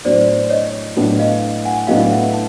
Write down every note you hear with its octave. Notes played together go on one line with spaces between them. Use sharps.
A2 F#3 B3 D4 C5 D5
C#5 D#5
A2 F#3 B3 D4
D#5 F5
F#5 G#5
A2 F#3 B3 D4 D#5 F5
E5 F#5
A5